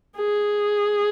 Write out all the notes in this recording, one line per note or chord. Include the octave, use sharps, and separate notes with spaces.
G#4